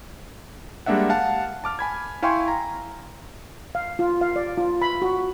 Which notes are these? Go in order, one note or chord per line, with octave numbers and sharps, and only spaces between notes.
G3 G#3 A#3 D4 E5 F#5
F5 F#5 A5
A5 D6 F6
G#5 B5 G#6
E4 F5 G5 G#5 C6 C#6
A#5
F5
F4
F5
D5
F4
B5
F#4